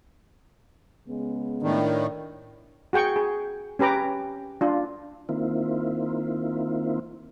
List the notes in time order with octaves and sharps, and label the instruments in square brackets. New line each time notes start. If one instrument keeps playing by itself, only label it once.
[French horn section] C#3 G#3 B3
[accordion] A2 D#3 [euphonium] D4
[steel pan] F#4 G#4 G5 C#6
G#4
C#4 G4 B4 A#5 D6
D4 F4
[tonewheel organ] D#3 A#3 C4 E4 F4